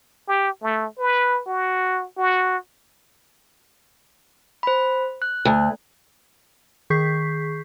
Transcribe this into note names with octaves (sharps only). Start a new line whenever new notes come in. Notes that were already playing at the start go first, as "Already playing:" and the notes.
G4
A3
B4
F#4
F#4
C5 B5
F#6
D2
D#3 G#4 C#6 G6 B6 C7